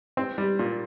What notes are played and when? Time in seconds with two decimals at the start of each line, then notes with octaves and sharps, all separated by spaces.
0.17 C4
0.38 G3
0.59 A#2